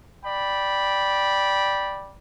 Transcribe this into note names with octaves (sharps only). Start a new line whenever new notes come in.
D5 G5 B5